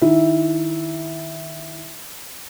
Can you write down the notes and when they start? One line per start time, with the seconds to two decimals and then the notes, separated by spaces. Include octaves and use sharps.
0.01 D#3 E4